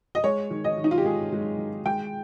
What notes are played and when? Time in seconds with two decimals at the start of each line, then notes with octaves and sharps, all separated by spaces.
0.15 D#5
0.24 G#3 C#5
0.51 D#3
0.64 D#5
0.78 D#3
0.84 D#4
0.91 F4
0.98 G4
1.05 G#3 G#4
1.33 G#3
1.58 D#3
1.86 G#3 G5